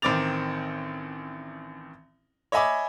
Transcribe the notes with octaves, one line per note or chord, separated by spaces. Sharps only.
A1 D#3 C4 D6 A6 F7
C#5 D#5 E5 G#5 B5 D6